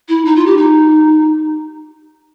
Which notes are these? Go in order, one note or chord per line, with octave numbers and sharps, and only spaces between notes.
E4
D#4
F4
G4
D#4